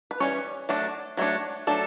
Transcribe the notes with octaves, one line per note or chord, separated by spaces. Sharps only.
B4
E3 G3 C#4 C#5
F#3 A3 D4
F#3 A3 D4 C#5
F#3 A3 D4 A4